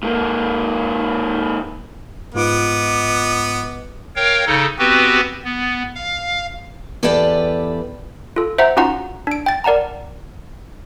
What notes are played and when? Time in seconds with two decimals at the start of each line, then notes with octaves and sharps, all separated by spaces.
0.03 G#2 A#3
2.34 G#2 B3 F4 D#5 D6 D7
4.16 A#4 C#5 F5 G5
4.47 C#3 D#4 A4
4.79 B3 C4 F#4 G4 B4
5.45 B3
5.95 F5
7.03 E2 G4 A4 B4 D5 G5
8.36 F4 A4
8.58 C5 E5 F#5 A#5
8.77 C#4 D#4 F4 F#4 F#5 A#5
9.27 D4 D7
9.46 G5 A6
9.64 A#4 D5 F#5 A5 A#5